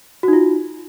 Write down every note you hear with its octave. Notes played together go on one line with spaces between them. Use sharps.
D#4 F4 F#4